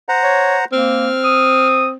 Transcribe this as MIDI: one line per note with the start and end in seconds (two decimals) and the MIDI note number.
0.09 0.65 72
0.09 0.65 78
0.09 0.65 82
0.23 0.57 73
0.72 1.09 58
0.72 1.96 60
0.72 1.68 89
1.24 1.88 87